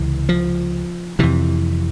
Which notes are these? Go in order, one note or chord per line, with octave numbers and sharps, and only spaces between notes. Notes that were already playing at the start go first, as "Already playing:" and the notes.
Already playing: C#2 C3 E3
F3
F2 C3 E3